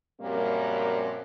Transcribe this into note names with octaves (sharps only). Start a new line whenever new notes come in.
F#2 A#2 F3 G3 A#3 C4